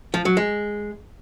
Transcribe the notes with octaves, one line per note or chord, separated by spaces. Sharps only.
F3
F#3
G#3